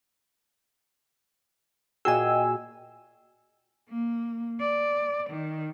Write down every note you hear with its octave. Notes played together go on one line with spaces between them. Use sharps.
A#2 F#4 G#4 D#5 G5 G#5 E6
A#3
D5
D#3